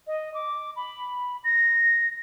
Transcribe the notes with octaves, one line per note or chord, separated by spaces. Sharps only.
D#5
D6
B5
A#6